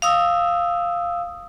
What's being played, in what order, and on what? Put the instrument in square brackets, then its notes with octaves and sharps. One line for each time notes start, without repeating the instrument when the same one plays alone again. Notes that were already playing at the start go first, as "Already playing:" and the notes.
[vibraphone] F5 D#6 E6